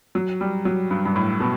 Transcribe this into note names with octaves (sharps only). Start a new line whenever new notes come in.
F#3
G3
F#3
G2
G2
A2
B2